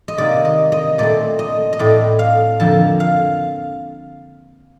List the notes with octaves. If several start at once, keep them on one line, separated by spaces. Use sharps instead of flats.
D#5
C3 D#3 A#3 D5
D#5
D#5
A#2 A3 C4 D5
D#5
D#5
A2 A3 C4 D5
F5
F2 D3 F3 A#3 A5
F5